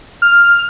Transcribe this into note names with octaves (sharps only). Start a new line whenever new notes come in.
F6